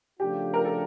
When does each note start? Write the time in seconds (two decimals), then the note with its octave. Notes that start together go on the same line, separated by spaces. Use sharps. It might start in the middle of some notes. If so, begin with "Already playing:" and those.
0.20 C#3 F3 A3 D4 F4 G4
0.54 A#4
0.65 A4